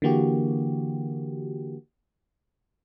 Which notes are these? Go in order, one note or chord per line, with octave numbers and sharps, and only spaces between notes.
D3 E3 A#3 F#4 G4